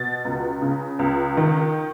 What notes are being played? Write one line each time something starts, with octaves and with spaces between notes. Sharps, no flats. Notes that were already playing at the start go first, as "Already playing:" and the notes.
Already playing: B2 A6
C#2
C#3
C#2
D#3